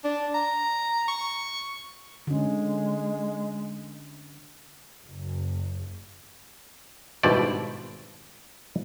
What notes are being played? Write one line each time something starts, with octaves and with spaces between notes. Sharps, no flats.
D4
A#5
C#6
D3 G#3 C#4
F#1
G#1 G2 B2 E4 C5 D5